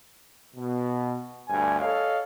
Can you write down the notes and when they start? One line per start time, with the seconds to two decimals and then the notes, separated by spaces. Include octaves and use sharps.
0.55 B2
1.48 D2 G2 G#5
1.80 A4 C#5 D#5 F5